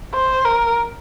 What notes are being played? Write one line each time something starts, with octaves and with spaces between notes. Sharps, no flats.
C5
A#4